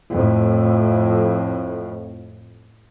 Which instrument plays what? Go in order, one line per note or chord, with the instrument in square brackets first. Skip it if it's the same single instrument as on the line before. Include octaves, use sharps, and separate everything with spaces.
[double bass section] F2 A2